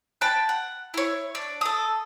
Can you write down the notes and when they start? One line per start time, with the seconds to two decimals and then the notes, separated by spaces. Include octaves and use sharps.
0.21 G5 A5 B5 F#6
0.49 F#5
0.94 E4 C#5
1.35 D4
1.61 A4 D#6